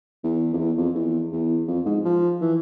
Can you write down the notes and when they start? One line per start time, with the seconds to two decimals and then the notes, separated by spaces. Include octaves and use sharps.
0.24 E2
0.53 F2
0.59 E2
0.77 F2
0.95 E2
1.33 E2
1.68 F2
1.86 G#2
2.05 F3
2.41 E3